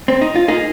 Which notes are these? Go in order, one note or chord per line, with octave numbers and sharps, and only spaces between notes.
C4
D#4
F4
A#3 D#4 G#4